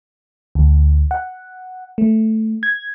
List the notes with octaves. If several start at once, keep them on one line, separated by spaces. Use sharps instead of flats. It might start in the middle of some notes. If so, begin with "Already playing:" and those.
D2
F#5
A3
G#6